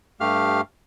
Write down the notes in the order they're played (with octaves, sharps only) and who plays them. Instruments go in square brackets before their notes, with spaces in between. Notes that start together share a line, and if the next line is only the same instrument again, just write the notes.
[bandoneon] G2 A3 G4 F5 F6